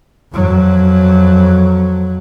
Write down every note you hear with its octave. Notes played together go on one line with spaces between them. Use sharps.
F2 F#3